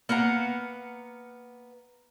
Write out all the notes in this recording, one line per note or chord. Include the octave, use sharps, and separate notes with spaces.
A#3 B3 F#5 A#5